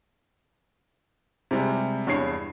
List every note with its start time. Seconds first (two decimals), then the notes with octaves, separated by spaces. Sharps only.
1.51 C3 G3 G#3
2.07 E2 G2 C#5 C7